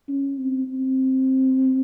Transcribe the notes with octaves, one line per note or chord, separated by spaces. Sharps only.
C#4
C4
C4